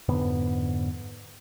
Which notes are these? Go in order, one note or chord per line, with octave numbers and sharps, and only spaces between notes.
F2 G#2 D3 B3